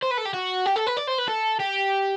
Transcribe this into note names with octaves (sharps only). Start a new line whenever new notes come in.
C5
B4
A4
G4
F#4
G4
A4
B4
D5
C5
B4
A4
G4